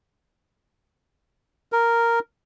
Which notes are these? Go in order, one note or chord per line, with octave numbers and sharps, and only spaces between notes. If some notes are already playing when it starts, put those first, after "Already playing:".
A#4